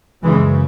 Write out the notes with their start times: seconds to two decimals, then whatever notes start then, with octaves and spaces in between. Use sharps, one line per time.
0.23 F#2 C#3 E3 G#3